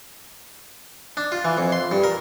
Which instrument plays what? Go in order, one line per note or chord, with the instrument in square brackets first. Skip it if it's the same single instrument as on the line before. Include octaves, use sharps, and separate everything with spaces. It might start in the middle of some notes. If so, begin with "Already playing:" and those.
[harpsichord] D4
F4
E3
F2
C6
G2
A#4